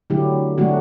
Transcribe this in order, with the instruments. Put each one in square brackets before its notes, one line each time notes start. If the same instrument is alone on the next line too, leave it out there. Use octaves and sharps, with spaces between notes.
[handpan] D3 F#3 A3 E4 G4
D3 F#3 A3 D4 F#4